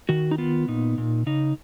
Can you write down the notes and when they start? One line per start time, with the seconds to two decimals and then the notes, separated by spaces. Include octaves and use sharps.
0.09 D#3 F#4
0.31 D#4
0.38 B3 F4
0.68 A#2 D#4
0.98 A#2
1.26 C#3 D#4